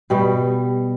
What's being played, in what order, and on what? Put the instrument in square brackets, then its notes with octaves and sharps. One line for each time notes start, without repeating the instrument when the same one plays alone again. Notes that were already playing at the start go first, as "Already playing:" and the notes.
[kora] B2 G3